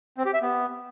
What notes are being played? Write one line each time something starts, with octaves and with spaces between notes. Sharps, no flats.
C4
G4
E5
B3